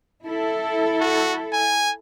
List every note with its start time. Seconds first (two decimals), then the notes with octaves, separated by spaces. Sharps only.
0.25 E4 A4
1.01 F#4
1.53 G#5